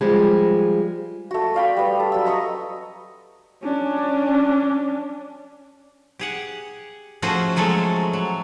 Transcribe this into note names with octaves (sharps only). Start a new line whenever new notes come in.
F3 G3 G#3
A3 F#4
D5 F5 G5 B5
G3 B3
A4
F#3 E6
D#5 A#5 C#6 D#6
C#4 D4
G4 G#4 F#5
F3 A3 C#4 F#4 G#4 C5
F3 F#3 G#3 A3 A4
F#3